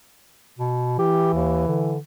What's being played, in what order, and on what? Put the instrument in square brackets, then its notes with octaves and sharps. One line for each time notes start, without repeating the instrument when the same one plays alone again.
[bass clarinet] B2
[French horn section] E3 [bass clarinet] G4
[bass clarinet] D#2
D3